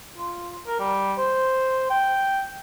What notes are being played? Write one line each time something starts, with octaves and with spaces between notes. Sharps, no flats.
F4
A#4
G3
C5
G5